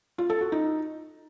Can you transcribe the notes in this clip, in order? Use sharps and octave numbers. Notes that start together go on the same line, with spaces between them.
F4
A4
F#4
D#4